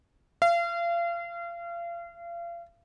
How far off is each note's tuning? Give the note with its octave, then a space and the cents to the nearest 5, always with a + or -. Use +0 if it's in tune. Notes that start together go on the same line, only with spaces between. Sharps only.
F5 -35